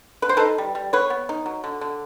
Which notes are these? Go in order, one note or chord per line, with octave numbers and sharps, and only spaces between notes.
D3 B4
C5
D#4 A4 B4
G3
G3
B3 B4 C#5
B3
D#4
F#3
D3
D3